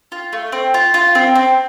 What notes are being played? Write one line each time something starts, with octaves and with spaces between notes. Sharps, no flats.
F4
A3
C4
F4
F4
C4
C4